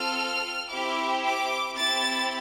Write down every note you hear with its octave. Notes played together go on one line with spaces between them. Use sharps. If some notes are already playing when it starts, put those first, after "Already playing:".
Already playing: C4 F4 A4 F6
C4 E4 G4 D6
D6
C4 E4 G4 A6